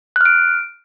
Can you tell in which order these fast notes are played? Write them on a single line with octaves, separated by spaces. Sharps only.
F#6 F6 D7